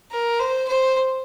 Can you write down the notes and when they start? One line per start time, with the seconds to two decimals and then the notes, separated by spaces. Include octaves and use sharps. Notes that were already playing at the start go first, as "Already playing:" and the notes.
0.11 A#4
0.40 C5
0.68 C5